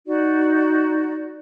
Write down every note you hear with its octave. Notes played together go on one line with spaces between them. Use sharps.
D#4 F#4 D5